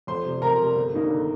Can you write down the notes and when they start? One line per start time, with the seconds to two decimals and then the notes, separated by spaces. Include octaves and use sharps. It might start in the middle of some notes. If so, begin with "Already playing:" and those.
0.07 F2 C5 C6
0.24 C3 G3
0.42 F2 A#4 A#5
0.59 C3 G3
0.76 G1
0.93 G2 D#3 A#3 D#4
1.10 G1